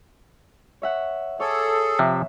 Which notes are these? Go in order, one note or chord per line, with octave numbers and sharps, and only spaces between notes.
C#5 E5 F#5
G#4 A4 C#5 D6
C3 F3 E5